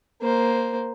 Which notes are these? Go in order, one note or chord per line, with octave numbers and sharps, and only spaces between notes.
A#3 C5